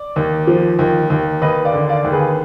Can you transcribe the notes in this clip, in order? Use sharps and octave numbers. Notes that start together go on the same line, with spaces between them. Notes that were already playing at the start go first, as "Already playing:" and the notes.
Already playing: D5
D#2
F3
D#2
D#2
D#2 B4 D#5
D5 F5
D3
D5 F5
D#2
G#4 B4